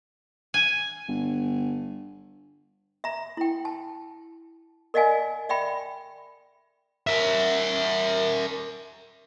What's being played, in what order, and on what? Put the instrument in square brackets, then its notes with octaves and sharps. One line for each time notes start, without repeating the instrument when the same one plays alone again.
[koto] G#5
[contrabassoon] G1
[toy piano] E5 A#5
E4 G5
A5
A#4 D5 D#5 F5 G#5 A5
D5 E5 G5 B5
[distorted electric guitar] A#4 E5